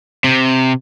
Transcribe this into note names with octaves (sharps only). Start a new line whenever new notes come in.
C3